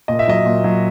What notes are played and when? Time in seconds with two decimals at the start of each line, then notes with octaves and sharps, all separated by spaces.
0.08 A#2 D#5
0.19 E5
0.28 F#3 D#5
0.46 A#2
0.64 F#3